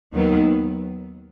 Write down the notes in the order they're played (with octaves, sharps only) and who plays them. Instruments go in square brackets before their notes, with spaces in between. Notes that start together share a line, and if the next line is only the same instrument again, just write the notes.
[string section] D#2 D#3 F#3 B3